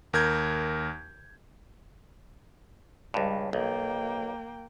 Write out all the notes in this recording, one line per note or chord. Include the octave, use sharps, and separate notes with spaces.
D#2 A#4 G6 G#6
C#2 G2 G3
B1 A#3 G5